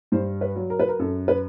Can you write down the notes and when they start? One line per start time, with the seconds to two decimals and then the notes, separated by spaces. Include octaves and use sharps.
0.12 G2 C5
0.41 B4
0.55 F#3
0.70 A#4
0.79 B4
0.89 A#4
0.99 F#2 A4
1.28 B4